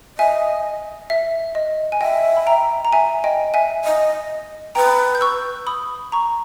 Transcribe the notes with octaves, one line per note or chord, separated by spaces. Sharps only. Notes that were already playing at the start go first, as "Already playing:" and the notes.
D#5 E5 G#5
E5
D#5
G#5
D#5 E5 G5
B5
G5 A#5
A#5
E5 G#5
D#5 G5
E5 G#5
D#5
B4 G5 A#5
G6
C#6 E6
B5 D#6
A#5 C#6